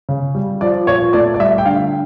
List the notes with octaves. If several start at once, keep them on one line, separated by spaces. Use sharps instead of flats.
C#3
G3
F3 D5
A#2 C#5
A3 D5
D5
G3 E5
G5
D3 F5